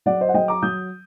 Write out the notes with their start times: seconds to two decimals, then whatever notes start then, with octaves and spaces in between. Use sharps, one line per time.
0.06 F#3 D5 F#5
0.21 C5 D#5
0.29 F#5
0.34 F#3 D#5 G5
0.48 A#5 D6
0.62 F#3 D#6 G6